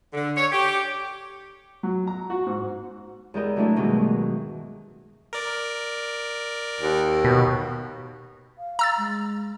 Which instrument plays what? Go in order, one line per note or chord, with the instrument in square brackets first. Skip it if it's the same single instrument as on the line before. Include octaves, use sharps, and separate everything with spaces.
[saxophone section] D3
C#5
G4
[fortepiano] F#3
A#5
F#4
G#2
[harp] E2 G#3 G4 A#4 D#5
E3 F#3 A3 D4 E4
G2 B2 D#3 E3 F#3 G#3
[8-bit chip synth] A#4 D5
[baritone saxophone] D#2
[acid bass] B2
[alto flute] F5
[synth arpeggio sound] A#5 E6 A6
[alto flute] G#3